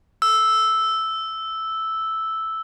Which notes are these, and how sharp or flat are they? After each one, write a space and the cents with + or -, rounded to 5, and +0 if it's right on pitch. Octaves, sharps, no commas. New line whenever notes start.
E6 -5